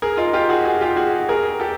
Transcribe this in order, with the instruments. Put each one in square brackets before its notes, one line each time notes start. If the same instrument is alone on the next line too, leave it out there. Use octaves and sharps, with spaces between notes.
[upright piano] G#4 A#4
D#4 F4
F4 G4
F#4 G#4
F#4 G#4
F4 G4
F#4 G#4
G#4 A#4
G4 A4